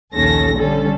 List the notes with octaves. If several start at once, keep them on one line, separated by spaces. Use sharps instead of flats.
A#1 D#2 C#3 C#4 A4 A#6
D3 G3 C#4 A4